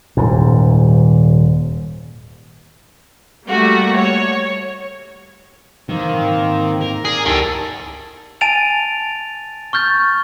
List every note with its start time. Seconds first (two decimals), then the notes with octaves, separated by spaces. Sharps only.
0.17 D#1 G#2
3.48 G3 A3 A#3 F#4
3.97 C#5
5.89 D#3 E3 A#3 C4
6.12 G#2
6.81 A#4
7.05 G#4 D5
7.25 C#2 D#3 E4 G4 A4 A#4
8.41 G#5 A5 A6 D7 D#7 F7
9.73 C#6 F6 G6 A6